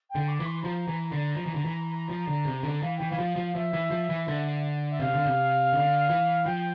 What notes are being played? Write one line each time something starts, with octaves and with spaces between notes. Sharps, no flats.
G5
D3
D6
E3
C6
F3 A#5
E3
D3
F3
E3
D3
E3
F3
D3
C3
D3
E3 F5
E3 G5
E3 F5
F3
F3
F5
F3 E5
E3
F3
E3
D3
E5
C3 F5
D3
C3
D3
E3
F3 G5